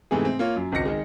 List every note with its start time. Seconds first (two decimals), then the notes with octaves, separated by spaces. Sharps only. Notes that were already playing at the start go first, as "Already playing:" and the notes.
0.11 G#2 C3 E3 A3 B3 G#4
0.25 C4
0.39 A#3 F4 C#5
0.56 F#2
0.72 G#1 C#2 D#4 A#6 C#7
0.86 D#3 G#3